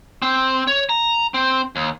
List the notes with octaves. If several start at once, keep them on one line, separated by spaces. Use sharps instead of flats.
C4
C#5
A#5
C4
D#2